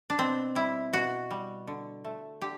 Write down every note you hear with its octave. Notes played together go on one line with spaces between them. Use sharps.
D4
B2 C4
G3 E4
B2 F#4
G3
D3
A3
D3 G4